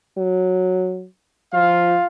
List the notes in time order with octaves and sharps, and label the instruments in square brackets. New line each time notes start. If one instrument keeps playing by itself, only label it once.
[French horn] F#3
[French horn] F3 [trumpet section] F4 F5